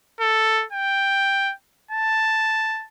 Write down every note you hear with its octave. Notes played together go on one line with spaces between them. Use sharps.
A4
G5
A5